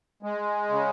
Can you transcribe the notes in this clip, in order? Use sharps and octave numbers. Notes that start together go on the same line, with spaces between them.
G#3
C#3